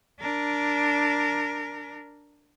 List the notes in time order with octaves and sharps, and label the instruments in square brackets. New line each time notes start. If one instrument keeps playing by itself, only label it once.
[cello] D4 A#4